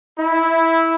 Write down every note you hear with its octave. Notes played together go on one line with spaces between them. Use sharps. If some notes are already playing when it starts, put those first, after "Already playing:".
E4